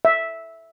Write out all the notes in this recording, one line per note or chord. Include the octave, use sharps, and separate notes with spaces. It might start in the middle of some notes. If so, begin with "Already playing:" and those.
E5